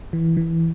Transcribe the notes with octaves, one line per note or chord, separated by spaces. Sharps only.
E3
E3